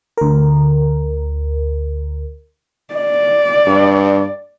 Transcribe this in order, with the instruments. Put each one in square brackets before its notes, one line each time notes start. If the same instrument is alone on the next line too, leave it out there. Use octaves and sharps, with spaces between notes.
[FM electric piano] D2 A#4
[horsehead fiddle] D5
[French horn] G2